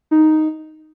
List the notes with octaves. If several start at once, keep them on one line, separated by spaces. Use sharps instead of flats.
D#4